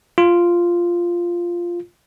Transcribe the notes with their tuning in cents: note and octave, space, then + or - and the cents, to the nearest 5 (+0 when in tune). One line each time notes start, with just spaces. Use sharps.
F4 -5